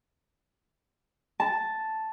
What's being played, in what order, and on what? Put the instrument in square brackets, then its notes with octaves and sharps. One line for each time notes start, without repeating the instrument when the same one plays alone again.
[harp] A5